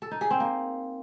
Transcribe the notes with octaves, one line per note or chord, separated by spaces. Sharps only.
A4
D#4
G#4
C4
A#3